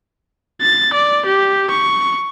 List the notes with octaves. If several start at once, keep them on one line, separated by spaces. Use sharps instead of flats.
A6
D5
G4
C#6